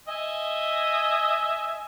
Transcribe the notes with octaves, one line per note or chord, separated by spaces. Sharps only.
D#5 E5 G#5